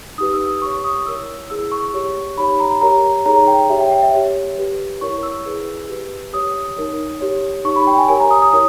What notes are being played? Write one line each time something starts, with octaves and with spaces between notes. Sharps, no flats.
D#4 G4 B4 D#6
E6
D#6
G4 C#5 C#6
C#6
D#6
E4 A#4 C#5 E6
E4 G#4 B4 E6
C#6
G4 C#5
D#4 G4 C#5 B5
A#5
G4 A#4 C#5 A#5
D#4 G#4 C#5 A#5
G5
G4 C#5 E5
G5
G5
E5
G4 C#5
G4 B4
E4 A#4 C#5 C#6
E6
E4 G#4 B4
G4 B4
G4 C#5 D#6
D#4 A#4 C#5
G4 C#5
D#4 G4 C#5 C#6
B5
G5
G#5
G4 A#4 C#5 G#5
A#5
D#6
D#6
E4 A#4 C#5 D#6